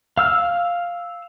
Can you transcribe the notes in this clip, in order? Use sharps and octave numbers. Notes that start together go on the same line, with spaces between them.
F5 E6 F6